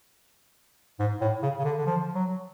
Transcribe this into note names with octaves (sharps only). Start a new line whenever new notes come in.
G#2
A2
C#3
C#3
D3
D3
F3
F#3